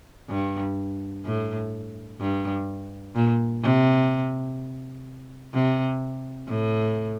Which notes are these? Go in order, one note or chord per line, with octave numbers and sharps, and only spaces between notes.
G2
A2
G2
A#2
C3
C3
A2